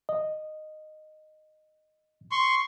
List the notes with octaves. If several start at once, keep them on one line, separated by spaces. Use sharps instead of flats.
D#5
C6 C#6